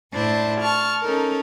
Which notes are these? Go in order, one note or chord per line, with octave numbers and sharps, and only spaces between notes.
A2 D4 E4 C5 A5
A5 C#6 F6
C#4 D#4 A4 A#4